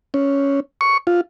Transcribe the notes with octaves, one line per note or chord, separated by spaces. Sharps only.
C#4
C#6
F4